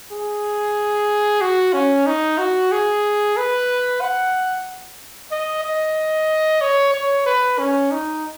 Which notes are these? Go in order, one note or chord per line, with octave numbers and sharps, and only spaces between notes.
G#4
F#4
C#4
D#4
F#4
G#4
B4
F#5
D#5
D#5
C#5
C#5
B4
C#4
D#4